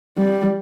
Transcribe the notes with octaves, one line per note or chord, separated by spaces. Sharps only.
G3